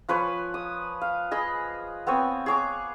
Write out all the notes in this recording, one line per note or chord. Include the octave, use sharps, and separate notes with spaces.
F3 B4 C#5 G#5
D#6
F5
G#4 D#5 B5
B3 C4 C#5 G#5
G#4 C#5 D6